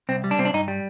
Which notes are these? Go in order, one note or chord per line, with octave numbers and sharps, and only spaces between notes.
C2 C4
G3
D4
C2 C4
D4
G2 D#4
G3